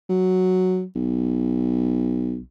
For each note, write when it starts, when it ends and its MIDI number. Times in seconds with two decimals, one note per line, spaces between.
0.09 0.85 54
0.95 2.40 35